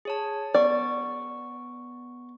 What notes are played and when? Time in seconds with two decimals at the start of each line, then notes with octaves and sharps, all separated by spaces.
0.05 G#4 C#5 A5
0.54 B3 D5 C#6